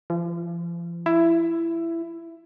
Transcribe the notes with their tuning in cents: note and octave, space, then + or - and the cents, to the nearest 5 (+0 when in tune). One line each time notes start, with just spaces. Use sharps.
F3 -40
E4 +15